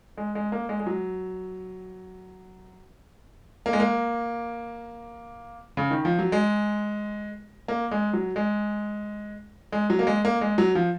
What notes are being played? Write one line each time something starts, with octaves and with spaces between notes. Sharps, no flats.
G#3
G#3
A#3
G#3
G#3
F#3
A#3
G#3
A#3
C#3
D#3
F3
F#3
G#3
A#3
G#3
F#3
G#3
G#3
F#3
A#3
G#3
A#3
G#3
F#3
F3